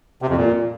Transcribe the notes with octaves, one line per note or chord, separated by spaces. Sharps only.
C3
F2
A#2